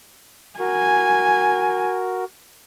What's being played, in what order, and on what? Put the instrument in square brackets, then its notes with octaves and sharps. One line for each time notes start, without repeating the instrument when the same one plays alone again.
[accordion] F#4 A#4 [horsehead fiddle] G#5